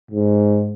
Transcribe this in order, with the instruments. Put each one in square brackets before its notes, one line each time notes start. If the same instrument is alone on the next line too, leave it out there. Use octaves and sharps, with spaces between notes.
[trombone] G#2